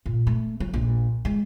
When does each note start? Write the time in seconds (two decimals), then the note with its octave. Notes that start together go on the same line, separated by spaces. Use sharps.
0.06 A#2
0.27 A3
0.60 F#3
0.74 A#1
1.25 G#3